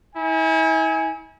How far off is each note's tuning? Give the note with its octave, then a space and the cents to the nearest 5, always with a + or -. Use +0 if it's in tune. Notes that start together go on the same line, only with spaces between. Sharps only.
E4 -40 G#5 -5